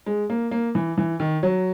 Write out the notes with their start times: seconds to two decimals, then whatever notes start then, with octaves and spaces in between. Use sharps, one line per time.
0.06 G#3
0.30 A#3
0.51 A#3
0.75 E3
0.98 E3
1.20 D#3
1.43 F#3